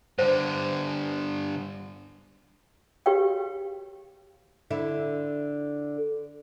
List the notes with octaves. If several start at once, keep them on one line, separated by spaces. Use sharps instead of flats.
G2 D3 C5
F#4 G4 B4 C#5 F5 G5
D3 E4 E5